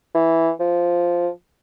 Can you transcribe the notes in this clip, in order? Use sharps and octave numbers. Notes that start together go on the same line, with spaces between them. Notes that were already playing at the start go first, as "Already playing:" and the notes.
E3
F3